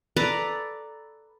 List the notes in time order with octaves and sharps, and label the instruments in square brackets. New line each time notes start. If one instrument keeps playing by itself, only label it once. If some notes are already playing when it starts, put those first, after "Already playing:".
[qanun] A4 B4 D5 A#5